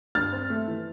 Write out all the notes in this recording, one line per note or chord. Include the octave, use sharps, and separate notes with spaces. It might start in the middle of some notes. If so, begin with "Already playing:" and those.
G2 F6 A6
C4
A3
E3